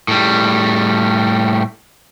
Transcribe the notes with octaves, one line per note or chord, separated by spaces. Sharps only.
A2 G3